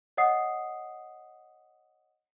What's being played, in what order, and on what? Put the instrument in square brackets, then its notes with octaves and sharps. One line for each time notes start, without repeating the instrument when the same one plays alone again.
[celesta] C#5 D#5 F#5 D#6 C7